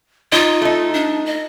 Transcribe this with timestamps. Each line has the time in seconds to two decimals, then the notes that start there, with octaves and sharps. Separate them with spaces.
0.32 D#4 F4
0.62 A3 D#4
0.94 D4
1.26 D#5